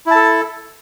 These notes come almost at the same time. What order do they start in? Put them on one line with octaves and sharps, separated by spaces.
E4 A5 A4